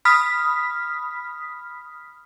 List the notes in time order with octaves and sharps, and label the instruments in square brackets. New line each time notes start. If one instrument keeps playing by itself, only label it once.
[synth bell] B5 D#6 F6 B6